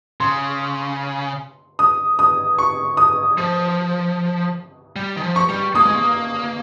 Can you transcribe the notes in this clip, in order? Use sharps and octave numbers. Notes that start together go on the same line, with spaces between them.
C#3 C6
D#6
D#6
C#6
D#6
F3
G3
D#3
F3
C#6
G3
A#3 D#6
G#3
A#3